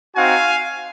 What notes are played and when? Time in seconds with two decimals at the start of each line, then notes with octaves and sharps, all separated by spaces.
0.15 C4 D#4 F#4 F5 G#5